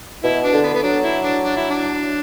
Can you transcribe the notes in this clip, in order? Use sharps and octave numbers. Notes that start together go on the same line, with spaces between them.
B2 E4
D4
D3
B3
B3
F#3 D4
E4
D4
D4
E4
D4